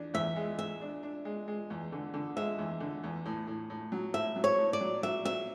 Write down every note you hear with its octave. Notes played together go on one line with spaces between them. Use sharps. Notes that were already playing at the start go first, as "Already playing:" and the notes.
Already playing: E2 D4
E2 E5
G#3
G#3 E5
D4
D4
G#3
G#3
E2
D3
D3
G#3 E5
E2
D3
E2
A2
A2
A2
F#3
A2 E5
F#3
C#5
A2
D5
F#3
F#3 E5
F#3 E5